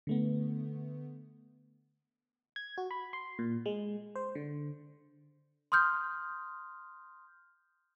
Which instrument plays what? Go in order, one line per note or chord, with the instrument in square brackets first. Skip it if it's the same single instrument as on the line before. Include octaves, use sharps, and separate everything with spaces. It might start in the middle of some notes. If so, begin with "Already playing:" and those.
[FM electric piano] D3 A3 B3
G#6
F#4
B5
C6
A#2
G#3
C5
D3
[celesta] C6 D#6 F6 G6